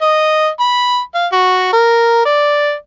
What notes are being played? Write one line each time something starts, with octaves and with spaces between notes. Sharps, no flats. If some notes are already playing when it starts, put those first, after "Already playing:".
D#5
B5
F5
F#4
A#4
D5